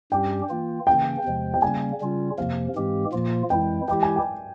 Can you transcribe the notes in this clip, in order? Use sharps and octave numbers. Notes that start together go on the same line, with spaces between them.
G2 G3 C#4 G4 G5
E3 A#3 F4
C#3 E3 A#3 C#4 G5
E2 C3 F3 G#3
G5
C#3 G3 A#3 C#4 G#5
C#3 G3 C#4 F4
F2 C3 F3 A#3 F5
G#2 E3 G#3 C4 G4
A#2 F3 A#3 F4
F2 E3 G#3 E4 G5
E3 G#3 E4 G4 G5
G#5
G5